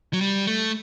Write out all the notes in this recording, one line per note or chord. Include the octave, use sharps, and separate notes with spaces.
F#3
G3
A3